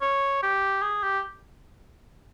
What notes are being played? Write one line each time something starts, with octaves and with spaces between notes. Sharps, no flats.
C#5
G4
G#4
G4